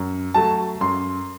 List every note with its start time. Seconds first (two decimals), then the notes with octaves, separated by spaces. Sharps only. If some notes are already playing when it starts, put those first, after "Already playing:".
Already playing: F#2
0.34 F#3 A3 A5
0.81 F#2 C6